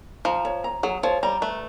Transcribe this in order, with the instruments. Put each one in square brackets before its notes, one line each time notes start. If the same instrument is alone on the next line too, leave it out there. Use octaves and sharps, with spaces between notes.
[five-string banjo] F3 [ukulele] A#5
[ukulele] C#5
A#5
[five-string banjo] F#3 [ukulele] G#4
[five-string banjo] F3 [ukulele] C#5
[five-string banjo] G3 [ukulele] A#5
[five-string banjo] A3 [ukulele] B4